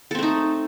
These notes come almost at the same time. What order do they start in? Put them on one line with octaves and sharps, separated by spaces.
A4 C4 A3 D#4